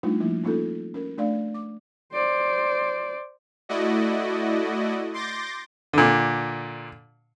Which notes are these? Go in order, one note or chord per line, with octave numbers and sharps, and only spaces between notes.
G3 A3 D4 D#4 F4
F3 A#3 E4
A#3 C#4 D#4 F4 A4
C#4 A#4
A3 D4 D5 F5
D6
C5 D5
A3 E4 F#4 D5 D#5
C6 D6 G6 A6 A#6
A#2 D3